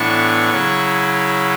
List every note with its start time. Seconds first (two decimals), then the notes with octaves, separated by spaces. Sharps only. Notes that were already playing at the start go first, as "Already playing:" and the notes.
Already playing: A2 E3 B3 D4 C#6
0.50 C#3 F#3 C#4 E4